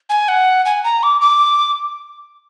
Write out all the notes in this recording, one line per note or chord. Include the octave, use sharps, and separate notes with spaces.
G#5
F#5
G#5
A#5
D6
D6